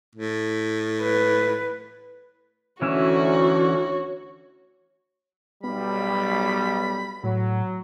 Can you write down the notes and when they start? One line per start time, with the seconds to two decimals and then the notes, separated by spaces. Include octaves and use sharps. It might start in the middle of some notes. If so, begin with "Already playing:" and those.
0.15 A2
1.02 B4
2.82 D2 E3 C#4 F#4 C#5 E5
5.64 B1 G3 B3 B5
7.24 A2 F#3